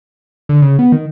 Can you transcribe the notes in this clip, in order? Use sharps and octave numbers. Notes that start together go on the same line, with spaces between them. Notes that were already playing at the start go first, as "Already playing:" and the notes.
D3
C#3
B3
D#3